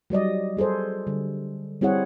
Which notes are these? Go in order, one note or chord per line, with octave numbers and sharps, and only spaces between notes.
F#3 G3 D5 D#5
G3 G#4 A4 C5
D3 G3
G3 C4 E4 G#4 C#5 F#5